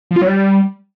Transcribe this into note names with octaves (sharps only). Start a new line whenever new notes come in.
F3
F4
F#3
G3